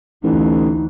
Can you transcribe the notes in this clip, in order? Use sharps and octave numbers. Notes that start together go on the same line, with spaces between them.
A1 D2 E3 D#4